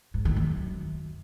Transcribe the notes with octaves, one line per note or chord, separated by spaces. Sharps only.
G#2
D#3
F#2